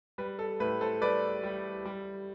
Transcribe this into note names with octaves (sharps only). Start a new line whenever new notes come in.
G3 B4
A4
A2 B4
A4 C5
G3 B4 D5
G3
G3